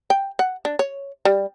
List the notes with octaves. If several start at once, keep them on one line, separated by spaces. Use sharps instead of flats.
G5
F#5
D4
C#5
G3